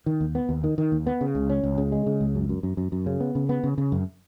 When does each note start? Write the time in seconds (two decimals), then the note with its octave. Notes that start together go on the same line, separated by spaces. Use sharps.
0.06 D#3
0.21 D#2
0.35 B3
0.49 D#2
0.64 D#3
0.78 D#3
0.92 D#2
1.07 B3
1.21 C#3
1.35 C#2
1.50 C#4
1.63 C#2
1.78 C#3
1.92 G#3
2.06 C#3
2.21 C#2
2.35 F#2
2.49 F#2
2.63 F#2
2.77 F#2
2.92 F#2
3.06 C#3
3.20 B3
3.35 C#3
3.49 B3
3.64 C#3
3.78 C#3
3.92 F#2